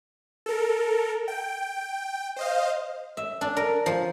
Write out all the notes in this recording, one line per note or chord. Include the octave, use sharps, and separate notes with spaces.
A4 A#4
G5
C5 D#5 F5
E5
D4
A#4
F3